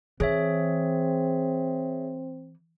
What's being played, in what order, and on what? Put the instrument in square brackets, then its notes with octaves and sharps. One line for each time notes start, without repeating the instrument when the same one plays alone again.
[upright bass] E3 [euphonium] C4 [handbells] G#4 C#5 E5